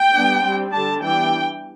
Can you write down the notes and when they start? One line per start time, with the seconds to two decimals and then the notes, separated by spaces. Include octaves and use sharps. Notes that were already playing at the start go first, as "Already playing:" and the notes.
Already playing: G5
0.14 G3 B3 D4
0.44 G3 C4
0.72 D3 G3 D4 A5
1.02 E3 G3 B3 D4 G5